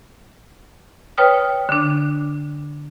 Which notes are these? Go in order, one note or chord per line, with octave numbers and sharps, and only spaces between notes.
B4 C#5 G5 D#6 F6
D3 D4